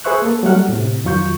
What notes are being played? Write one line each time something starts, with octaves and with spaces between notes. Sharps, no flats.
G#4 B4 C5 E5 C#6 F#6
A#3 A4
F#3 G3 A3 F#5 F6
A2 C3
F2 D#3 F#3 F4 C#6 G6